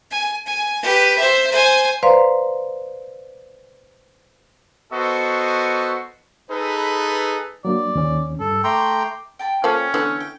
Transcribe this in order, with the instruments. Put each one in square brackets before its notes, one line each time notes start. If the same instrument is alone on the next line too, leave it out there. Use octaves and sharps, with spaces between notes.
[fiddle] G#5
G#5
G4 B4
C5 E5
C5 G#5
[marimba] B4 C5 D5 F5 A#5 C6
[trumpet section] B3 F#4 A4 C5 D#5 C#6
D#4 G#4 A4 B4
[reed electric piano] F#3 A#3 D4 [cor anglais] D5
[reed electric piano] D#2 C#4
[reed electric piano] G2 [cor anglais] A4
[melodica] A3 A#5 C6 [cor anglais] G5 [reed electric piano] D6
[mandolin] G5 A5 B5
[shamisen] F3 A#3 A4 [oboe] C#4
[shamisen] D3 E3 B3 [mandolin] A3 A4 F#6
[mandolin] G5